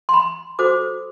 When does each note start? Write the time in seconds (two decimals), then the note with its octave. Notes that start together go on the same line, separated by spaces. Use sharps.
0.09 C6
0.14 B5
0.59 F#4 A4 C5 D6